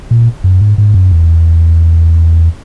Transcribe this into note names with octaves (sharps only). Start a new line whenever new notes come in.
A#2
F#2
G#2
G#2
F#2
E2